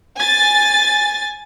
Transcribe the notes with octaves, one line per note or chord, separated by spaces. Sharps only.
G#5 A6